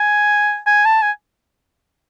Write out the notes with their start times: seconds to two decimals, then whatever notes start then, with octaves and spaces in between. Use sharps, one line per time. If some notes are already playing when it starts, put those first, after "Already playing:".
Already playing: G#5
0.67 G#5
0.85 A5
1.02 G#5